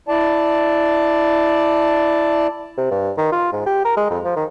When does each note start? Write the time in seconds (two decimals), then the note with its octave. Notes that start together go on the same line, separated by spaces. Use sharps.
0.08 E4 D5 A5
2.77 C3
2.91 G2
3.17 D#3
3.32 F4
3.53 G#2
3.66 G4
3.84 A#4
3.97 G#3
4.10 F2
4.24 F3
4.36 D#3